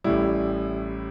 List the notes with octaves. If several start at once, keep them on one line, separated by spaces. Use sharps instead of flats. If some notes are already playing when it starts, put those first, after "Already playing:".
A1 A2 G3 E4